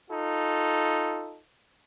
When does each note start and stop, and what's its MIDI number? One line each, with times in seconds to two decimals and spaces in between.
0.10 1.40 63
0.10 1.40 65
0.10 1.40 69